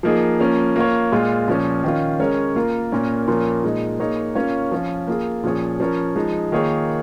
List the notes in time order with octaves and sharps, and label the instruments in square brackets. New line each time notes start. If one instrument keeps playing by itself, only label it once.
[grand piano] F3 A#3 D#4 G#4
F3 A#3 C#4
A#3 F4 C#5
A#2 G#3 F4
A#2 F3 C#4
D#3 C#4 F4
G#3 C#4 A#4 C#5
A#3 F4 A#4
A#2 A#3 C#4 A#4
A#2 F3 A#3 C#4
A#2 G#3 D#4
A#3 D#4 G#4 C#5
A#3 C#4 F4 C#5
F3 C#4 F4
A#3 F4 G#4
A#2 F3 C#4 G#4 C#5
F3 C#4 A#4 C#5
F3 G#3 D#4
D#3 A#3 F4 G#4 C#5